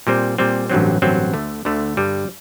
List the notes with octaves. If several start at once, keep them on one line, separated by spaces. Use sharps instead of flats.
A#2 G3 C4
A#2 G3 C4
A1 G2 D3 F#3 C4
A1 G2 D3 F#3 C4
D2 D3 A3
D2 D3 A3
G2 D3 G3